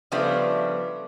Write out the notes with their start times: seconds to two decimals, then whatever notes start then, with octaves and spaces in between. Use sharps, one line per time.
0.12 C#3 F3 G3 A3 B3 D4